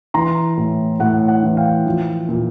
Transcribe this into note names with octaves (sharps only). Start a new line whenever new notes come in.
E3 A#5 C6
A2
A2 F#5
F#5
E3
F5 G5
F3
A#2